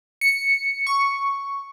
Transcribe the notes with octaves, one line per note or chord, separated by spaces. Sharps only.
C#7
C#6